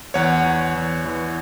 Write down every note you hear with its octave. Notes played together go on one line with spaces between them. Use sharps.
E2 C#5 F#5
E2
E2
E3